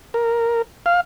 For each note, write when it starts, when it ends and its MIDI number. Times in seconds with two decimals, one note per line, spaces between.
0.14 0.62 70
0.86 1.01 77